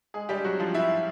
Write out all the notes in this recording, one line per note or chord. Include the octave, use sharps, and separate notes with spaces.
G#3 G#4
G3 G4
F#3 F#4
F3 F4
E4